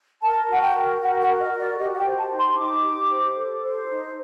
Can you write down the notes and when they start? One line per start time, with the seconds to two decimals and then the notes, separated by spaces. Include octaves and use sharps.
0.22 A#4 A5
0.49 F#4 F#5
0.61 G5
0.75 A#4
1.01 F#4 F#5
1.20 F#5
1.26 A#4
1.40 D#5
1.53 F#4
1.59 D5
1.79 G4 D#5
1.94 F#5
1.98 G5
2.05 C5
2.18 A5
2.31 D#4
2.38 C6
2.57 D#4 D6
2.84 G4
3.09 C5
3.35 A4
3.61 C5
3.87 D#4